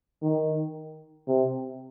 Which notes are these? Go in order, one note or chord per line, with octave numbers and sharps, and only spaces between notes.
D#3
C3